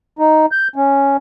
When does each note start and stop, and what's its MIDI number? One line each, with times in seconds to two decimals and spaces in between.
0.19 0.46 63
0.52 0.68 91
0.76 1.17 61